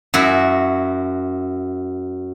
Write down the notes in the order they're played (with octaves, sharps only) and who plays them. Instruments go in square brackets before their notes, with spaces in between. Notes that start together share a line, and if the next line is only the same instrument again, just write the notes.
[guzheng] F#2 E4 F#4